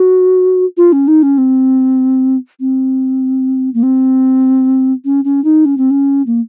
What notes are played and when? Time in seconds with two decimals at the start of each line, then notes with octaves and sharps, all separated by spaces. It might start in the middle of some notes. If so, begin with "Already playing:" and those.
Already playing: F#4
0.77 F4
0.92 C#4
1.08 D#4
1.23 C#4
1.38 C4
2.60 C4
3.74 A#3
3.83 C4
5.05 C#4
5.24 C#4
5.44 D#4
5.65 C#4
5.78 C4
5.90 C#4
6.27 A#3